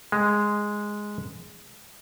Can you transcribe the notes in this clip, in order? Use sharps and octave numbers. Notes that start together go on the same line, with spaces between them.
G#3